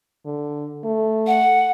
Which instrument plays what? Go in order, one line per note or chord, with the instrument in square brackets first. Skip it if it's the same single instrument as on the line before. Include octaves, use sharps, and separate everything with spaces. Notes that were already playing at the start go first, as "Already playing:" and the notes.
[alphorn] D3
A3
[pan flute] F#5